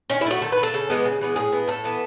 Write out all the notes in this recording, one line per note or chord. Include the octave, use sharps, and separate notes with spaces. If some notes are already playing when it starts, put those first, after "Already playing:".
D#3 C#4
E4
A3 F#4
D#3 A4
B4
A3
A4
C#3
E3 G#3 B3
C#3
E3 G#3 B3
A2 G#4
E3 B3
A2 A4
E3 B3